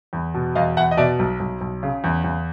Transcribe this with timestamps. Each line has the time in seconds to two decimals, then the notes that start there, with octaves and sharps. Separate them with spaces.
0.13 E2
0.34 B2
0.55 E2 D#5 F5
0.77 E2 E5 F#5
0.91 D#5
0.97 B2 D5 E5
1.19 B1
1.40 B1
1.61 B1
1.83 C#3
2.04 E2
2.24 E2